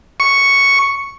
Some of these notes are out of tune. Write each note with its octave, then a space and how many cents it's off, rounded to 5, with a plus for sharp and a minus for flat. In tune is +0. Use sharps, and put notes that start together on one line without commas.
C#6 +0